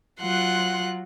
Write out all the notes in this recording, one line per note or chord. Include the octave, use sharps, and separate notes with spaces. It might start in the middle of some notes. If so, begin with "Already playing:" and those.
F#3 F4 F#5 C6 F#6